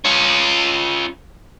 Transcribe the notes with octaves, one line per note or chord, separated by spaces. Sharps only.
C#4 F4